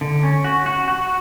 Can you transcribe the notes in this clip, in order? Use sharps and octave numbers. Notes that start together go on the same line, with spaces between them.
D3
C#4
F#4
F#4
F#4